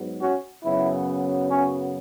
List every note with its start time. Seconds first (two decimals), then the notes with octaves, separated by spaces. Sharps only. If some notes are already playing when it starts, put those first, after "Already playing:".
Already playing: G#2 F#3 B3
0.21 C#4 F#4
0.64 F#2 C#3 F#3 B3 E4
1.51 C#4